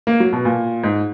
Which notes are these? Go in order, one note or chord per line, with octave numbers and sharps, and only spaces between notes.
A#3
F#3
B2
A#2
G#2